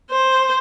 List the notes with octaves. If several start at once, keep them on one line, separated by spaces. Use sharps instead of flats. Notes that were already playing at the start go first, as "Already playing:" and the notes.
C5